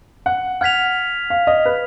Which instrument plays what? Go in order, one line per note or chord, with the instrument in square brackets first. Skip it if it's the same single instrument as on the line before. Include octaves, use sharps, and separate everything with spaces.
[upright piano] F#5
[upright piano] F#5 [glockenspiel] F6 G#6 B6 F7
[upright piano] F5
D#5
B4